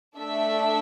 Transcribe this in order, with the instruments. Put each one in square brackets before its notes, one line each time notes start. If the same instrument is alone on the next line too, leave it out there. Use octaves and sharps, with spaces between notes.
[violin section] A3 D4 A4 E5